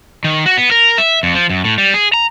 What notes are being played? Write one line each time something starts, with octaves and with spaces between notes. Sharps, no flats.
D#3
F#4
B3
A#4
E5
F2
F3
F#2
A2
G3
G#4
A#5